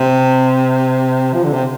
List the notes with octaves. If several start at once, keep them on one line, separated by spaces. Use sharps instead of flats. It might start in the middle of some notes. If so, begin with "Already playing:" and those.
Already playing: C3
F3
D3
C3